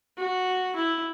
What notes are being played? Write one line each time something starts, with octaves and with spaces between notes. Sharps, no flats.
F#4
E4